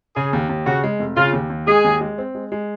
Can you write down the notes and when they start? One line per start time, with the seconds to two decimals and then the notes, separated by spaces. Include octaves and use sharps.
0.16 C#3 G#4
0.33 D#2
0.49 D#2
0.66 C#3 F#4
0.84 G#3
0.99 F1
1.17 C#3 F4
1.33 D#2
1.50 D#2
1.67 G#3 G#4
1.84 D#2
2.01 G#3
2.18 C4
2.35 G#3
2.52 G#3